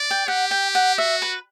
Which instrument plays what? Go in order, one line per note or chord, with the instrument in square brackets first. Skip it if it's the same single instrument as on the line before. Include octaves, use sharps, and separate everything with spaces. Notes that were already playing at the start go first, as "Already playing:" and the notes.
Already playing: [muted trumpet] D5
[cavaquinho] G5
[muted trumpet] G4 [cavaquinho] F#5
[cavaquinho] G5
F#5
[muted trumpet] F#4 [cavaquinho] E5
[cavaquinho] B4